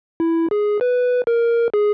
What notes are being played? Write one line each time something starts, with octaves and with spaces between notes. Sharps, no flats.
E4
G#4
B4
A#4
G#4